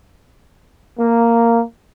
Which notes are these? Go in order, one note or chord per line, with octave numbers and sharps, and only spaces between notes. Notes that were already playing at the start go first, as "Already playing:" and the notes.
A#3